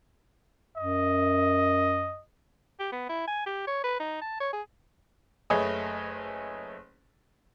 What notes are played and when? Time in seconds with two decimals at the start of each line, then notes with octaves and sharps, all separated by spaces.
0.77 F#2 D#5
2.80 G4
2.92 B3
3.09 E4
3.28 G#5
3.46 G4
3.67 C#5
3.84 B4
4.00 D#4
4.21 A5
4.40 C#5
4.53 G#4
5.50 F#1 A3 G#4 B4 C#5 D#5